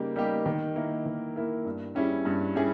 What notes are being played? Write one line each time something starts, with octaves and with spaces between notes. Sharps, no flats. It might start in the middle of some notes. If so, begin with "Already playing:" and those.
Already playing: C#3 G3 A#3 D#4 G4
G3 A#3 D#4 G4
D#3
A#3 E4 A#4
D#3
A#3 E4 A#4
G2
G3 C#4 E4 G#4
G2
G3 C#4 E4 G#4